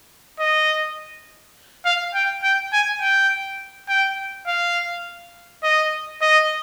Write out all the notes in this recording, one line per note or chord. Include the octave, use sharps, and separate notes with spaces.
D#5
F5
G5
G5
G#5
G5
G5
F5
D#5
D#5